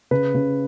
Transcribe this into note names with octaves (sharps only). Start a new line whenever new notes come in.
C#3 B4
C#3